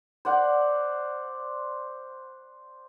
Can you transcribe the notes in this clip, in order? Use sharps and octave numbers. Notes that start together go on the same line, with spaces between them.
C5 D5 F#5